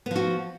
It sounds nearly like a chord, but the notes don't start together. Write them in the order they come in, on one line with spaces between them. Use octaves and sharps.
B3 F3 F#4